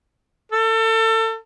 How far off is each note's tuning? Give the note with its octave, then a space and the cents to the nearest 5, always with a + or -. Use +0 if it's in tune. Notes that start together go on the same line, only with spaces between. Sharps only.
A4 +30